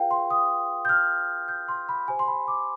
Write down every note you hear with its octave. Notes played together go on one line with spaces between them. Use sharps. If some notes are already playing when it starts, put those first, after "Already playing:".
Already playing: F4 G#4 B4 F5 G5
C6
D#6
G6
F6
G6
C6
B5
G4 C5 G#5
C6
B5
D6